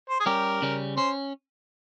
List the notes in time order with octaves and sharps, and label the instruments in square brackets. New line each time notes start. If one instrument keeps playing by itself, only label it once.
[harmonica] C5
G#4
[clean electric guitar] G3 C#4 G4 [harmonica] A#4
[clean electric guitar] C#3 G3 C#4
[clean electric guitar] C#4 [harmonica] C5